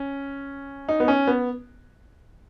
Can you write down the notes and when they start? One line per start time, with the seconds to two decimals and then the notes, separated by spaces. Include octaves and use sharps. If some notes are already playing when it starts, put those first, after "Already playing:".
Already playing: C#4
0.89 D#4
1.00 B3
1.08 C#4
1.27 B3